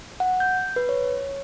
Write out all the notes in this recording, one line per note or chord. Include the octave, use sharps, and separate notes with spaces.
F#5
G6
B4
C#5